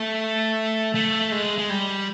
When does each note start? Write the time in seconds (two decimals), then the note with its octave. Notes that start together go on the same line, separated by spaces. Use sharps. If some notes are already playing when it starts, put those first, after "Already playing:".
Already playing: A3
0.95 A3
1.32 G#3
1.58 G#3
1.70 G3